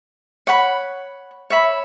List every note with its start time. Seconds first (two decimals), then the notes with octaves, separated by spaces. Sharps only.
0.47 C#5 F#5 B5
1.50 C#5 E5 B5